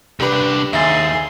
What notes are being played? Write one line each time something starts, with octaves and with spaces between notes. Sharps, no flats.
C2 D4 G4 B4
D#2 G#4 E5 C6 A6